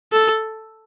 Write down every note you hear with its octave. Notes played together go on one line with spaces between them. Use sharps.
A4